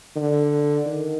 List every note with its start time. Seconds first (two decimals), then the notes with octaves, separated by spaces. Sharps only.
0.16 D3
0.86 D#3